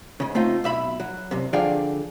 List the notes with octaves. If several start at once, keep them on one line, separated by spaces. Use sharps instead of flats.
G#2 C#3
A3 C4 D#4 F4
B1 E5 B5
F#3
C2 F#2 C3
D3 F3 D4 G#4 F5 G5